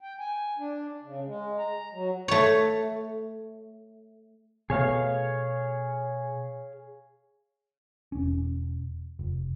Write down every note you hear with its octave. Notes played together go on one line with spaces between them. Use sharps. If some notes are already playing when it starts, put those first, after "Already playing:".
G5
G#5
D4
C#3
G#3
A#5
F#3
A3 C#5
B2 A3 G#4 C#5 F5
E1 C#4
F1